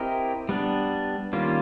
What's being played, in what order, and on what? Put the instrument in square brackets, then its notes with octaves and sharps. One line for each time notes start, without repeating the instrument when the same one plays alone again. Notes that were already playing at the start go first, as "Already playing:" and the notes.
Already playing: [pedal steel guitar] C4 E4 G4 A#4 D#5
G3 B3 D4
D#3 G3 A#3 C#4 F4